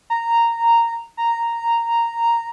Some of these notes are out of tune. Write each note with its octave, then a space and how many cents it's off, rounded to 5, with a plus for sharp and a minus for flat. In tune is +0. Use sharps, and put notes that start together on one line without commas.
A#5 -10
A#5 -5